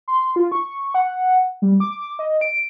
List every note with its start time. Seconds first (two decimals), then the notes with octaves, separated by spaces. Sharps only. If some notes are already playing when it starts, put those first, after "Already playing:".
0.08 C6
0.36 F4
0.52 C#6
0.94 F#5
1.62 G3
1.80 D6
2.19 D#5
2.41 D7